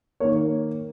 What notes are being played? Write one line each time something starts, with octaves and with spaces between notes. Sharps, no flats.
D#3 A#3 C#5